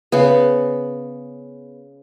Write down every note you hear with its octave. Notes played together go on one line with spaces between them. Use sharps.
C#3 B3